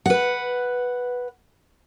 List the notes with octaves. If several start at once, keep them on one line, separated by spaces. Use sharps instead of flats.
B4 F#5